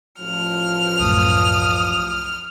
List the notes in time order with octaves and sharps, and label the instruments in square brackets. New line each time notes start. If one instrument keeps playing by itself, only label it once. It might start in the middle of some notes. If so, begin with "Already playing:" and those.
[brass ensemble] A1 F3 [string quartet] F6
[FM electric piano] C2 F#2 A2 [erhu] D#6